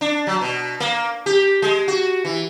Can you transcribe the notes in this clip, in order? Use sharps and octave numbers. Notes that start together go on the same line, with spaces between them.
D4
F#3
B2
A#3
G4
G#3
F#4
E3